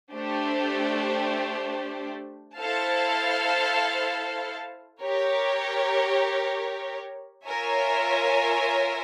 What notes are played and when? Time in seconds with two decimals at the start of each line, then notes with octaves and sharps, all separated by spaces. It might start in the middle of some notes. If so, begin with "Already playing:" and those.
0.14 A3 D4 G4 C5
2.57 E4 A4 C5 F5 A5
5.02 G4 A#4 C#5
7.46 F4 A#4 C#5 E5 G#5